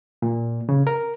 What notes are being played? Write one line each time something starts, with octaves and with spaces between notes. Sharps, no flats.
A#2
C#3
A#4